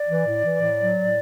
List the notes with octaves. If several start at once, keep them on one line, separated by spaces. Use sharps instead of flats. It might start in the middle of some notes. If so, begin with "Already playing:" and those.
Already playing: D5
E3
A2
E3
A2
F#3
A2